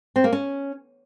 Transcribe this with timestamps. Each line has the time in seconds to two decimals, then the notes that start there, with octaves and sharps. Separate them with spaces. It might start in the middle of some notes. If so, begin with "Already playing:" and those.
0.16 C4
0.24 A#3
0.33 C#4